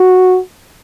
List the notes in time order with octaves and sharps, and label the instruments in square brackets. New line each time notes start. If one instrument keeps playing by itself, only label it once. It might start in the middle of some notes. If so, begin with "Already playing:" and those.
Already playing: [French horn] F#4